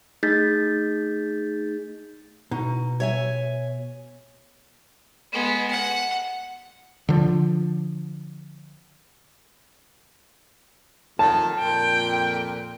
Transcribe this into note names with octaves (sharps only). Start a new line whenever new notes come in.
A3 D#4 G#4 G6 A6 B6
B2 D#4
C#5 E5 G#5
G#3 B3
F#5
D3 F3
F2 D#3 A5
F2 A#2 G5